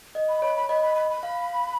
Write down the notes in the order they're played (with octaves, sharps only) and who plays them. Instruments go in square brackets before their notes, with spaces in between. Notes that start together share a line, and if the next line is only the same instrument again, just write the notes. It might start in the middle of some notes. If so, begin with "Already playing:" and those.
[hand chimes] D#5
[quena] B5
[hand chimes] C#5 [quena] B5
[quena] B5
[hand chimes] D#5 [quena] B5
[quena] B5
B5
B5
[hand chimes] F5